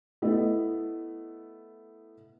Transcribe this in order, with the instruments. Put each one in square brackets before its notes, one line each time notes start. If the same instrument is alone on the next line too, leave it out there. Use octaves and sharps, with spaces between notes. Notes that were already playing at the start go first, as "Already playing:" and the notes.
[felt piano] A3 B3 E4 D#5